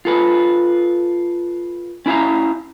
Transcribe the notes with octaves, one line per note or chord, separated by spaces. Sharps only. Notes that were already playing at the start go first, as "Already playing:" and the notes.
F4 A4 B4
C#4 E4 E5 F5 A#5